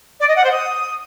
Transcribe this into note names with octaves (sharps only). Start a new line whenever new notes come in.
D5
D#5
F#5
C5
D#6